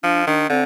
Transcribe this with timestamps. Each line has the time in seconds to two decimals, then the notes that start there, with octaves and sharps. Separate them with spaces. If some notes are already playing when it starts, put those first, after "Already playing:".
0.03 F3 D4
0.27 D#3 D4
0.50 D3 C4